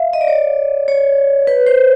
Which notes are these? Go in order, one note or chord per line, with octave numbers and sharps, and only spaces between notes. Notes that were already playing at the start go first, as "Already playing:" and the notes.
Already playing: E5 F5
D#5
D5
C#5
C#5
B4
C5